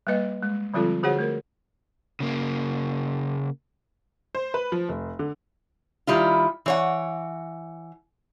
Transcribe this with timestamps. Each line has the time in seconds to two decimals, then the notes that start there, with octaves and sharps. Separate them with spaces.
0.07 G3 A#3 B4 D#5
0.43 G#3
0.74 D3 F3 G3 C4 F4 A4
1.03 D3 F#4 G#4 C5 C#5 F#5
1.19 A3 A#4
2.20 C#3 A#3
4.35 C5
4.54 B4
4.72 F3
4.89 F1
5.19 D3
6.07 D#3 G3 E4 F4
6.66 E3 C#5 F#5